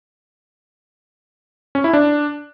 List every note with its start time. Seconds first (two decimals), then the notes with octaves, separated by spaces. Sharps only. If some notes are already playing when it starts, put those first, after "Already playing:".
1.75 C#4
1.84 E4
1.93 D4